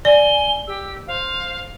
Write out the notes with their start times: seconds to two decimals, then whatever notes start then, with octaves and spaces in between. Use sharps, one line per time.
0.05 D5 G#5 G7
0.67 G4 E6
1.07 C5 F5